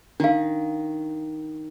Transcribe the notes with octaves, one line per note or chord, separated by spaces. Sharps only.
D#3 D4 F5